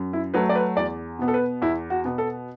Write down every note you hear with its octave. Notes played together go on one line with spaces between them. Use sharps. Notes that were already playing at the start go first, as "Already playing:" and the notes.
Already playing: F#2
E4
F#3 A3 B4
D5
B4
E2 D5
B2 B3
A4
B4
E2 E4
F#4
B2 B3
A4